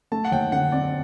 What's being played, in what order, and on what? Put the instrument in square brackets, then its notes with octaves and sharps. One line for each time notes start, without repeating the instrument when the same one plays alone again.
[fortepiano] A3 [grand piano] A5
[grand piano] F#5
[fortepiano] D#2 [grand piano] G5
[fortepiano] D3 [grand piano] F#5
[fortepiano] C4 [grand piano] D5